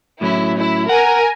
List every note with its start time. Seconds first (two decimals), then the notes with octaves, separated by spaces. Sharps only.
0.21 A2 F#3 C#4 E4
0.55 E4
0.89 A#4 F#5 G#5 A#5